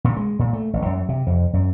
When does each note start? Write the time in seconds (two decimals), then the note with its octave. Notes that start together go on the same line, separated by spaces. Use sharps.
0.04 A#2
0.17 G#3
0.39 A#2
0.53 A3
0.73 A1
0.85 F#2
1.09 C3
1.27 F2
1.53 F#2